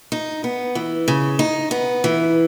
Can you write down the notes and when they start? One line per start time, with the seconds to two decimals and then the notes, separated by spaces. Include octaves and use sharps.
0.12 D#4
0.44 B3
0.75 E3
1.08 C#3
1.39 D#4
1.71 B3
2.04 E3